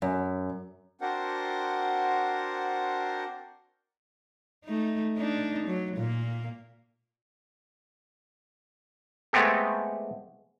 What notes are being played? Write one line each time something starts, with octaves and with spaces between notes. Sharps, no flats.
F#2
C4 D4 F#4 A#4 C5 F#5
A3 D#4
D4 D#4
F#3
A#2 A#3
G#3 A3 B3 C4 G4 A4